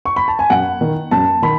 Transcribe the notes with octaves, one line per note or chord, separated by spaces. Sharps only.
C#6
B5
A5
G#5
F#2 F#5
D#3
F#2 A5
D#3 B5